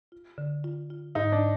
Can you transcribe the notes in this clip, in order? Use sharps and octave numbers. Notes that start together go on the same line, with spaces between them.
F4
D3
F4
F4
G#2 D#4
D4